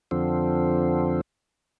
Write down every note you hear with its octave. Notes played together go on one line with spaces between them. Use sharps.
F2 D3 F3 C4